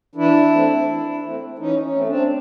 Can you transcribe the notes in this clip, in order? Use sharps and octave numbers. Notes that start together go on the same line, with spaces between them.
E3 D4 E4
A3 C4
E3
A3 C4
E3 C#4 D#4
C#4
A3 C4
C4 D4